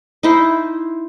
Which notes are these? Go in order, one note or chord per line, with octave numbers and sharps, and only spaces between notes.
D#4 E4 C5